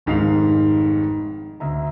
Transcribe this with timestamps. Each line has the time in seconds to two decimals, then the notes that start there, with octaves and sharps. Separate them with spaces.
0.06 F1 G#2 D#3 F5 C7 F7
1.60 D2 E5 A#5